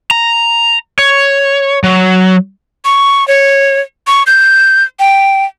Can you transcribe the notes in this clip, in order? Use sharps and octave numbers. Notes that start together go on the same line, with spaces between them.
A#5
C#5
F#3
C#6
C#5
C#6
G6
G5